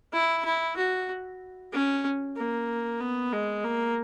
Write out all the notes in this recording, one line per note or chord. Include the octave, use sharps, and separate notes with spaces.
E4
E4
F#4
C#4
A#3
B3
G#3
A#3